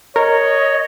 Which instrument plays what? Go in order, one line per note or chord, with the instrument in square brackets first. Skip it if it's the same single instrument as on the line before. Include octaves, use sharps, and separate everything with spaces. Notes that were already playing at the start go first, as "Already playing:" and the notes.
[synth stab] A#4 [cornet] C#5 [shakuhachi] D#5